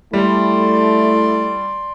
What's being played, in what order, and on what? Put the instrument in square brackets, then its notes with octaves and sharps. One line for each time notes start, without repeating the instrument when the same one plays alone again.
[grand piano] G3 [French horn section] A3 [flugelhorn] E4 [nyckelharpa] D5 C6